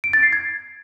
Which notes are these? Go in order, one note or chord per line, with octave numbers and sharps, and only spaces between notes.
D7
A6
C7
G#6